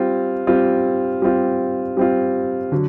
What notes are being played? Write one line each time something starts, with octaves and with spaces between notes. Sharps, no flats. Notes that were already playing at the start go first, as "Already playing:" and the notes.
Already playing: G3 C4 F4
G3 C4 F4
G3 C4 F4
G3 C4 F4
D3 F#3